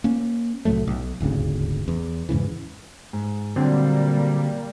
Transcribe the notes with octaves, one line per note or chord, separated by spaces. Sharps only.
A#3 C#4
C2 A2 F#3 A3
B1
D#1 G#1 D2 C#3
E2
E2 G#2 C#3 E3
G#2
A#2 D3 F#3 G3 A#3 C4